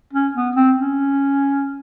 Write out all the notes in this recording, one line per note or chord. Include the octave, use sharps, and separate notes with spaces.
C#4
B3
C4
C#4